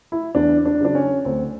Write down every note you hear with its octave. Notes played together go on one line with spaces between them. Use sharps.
E4
E2 D4
D4
C#3 F#3 D4
C#4
D2 C4